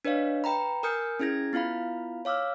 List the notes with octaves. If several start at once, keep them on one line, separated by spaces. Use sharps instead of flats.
D4 B4 C#5 D#5 F5
B4 G5 A#5 B5
A#4 G#5 D#6 F6 G6 C#7
C#4 E4 G#4 G#6 A#6
B3 E4 F4 F5 B5
C#5 F5 D6 E6 F6